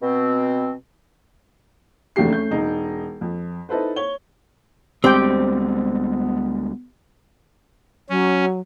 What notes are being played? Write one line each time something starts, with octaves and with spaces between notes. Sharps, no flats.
B2 C4
F1 E2 A3 D4 G4 C7
A3 C#4 G6
E1 D#4
F2
D#4 E4 A4 B4 C5
C#5 G7
D2 G3 G#3 B3 C4 G4 C5 G5
F#3 C#4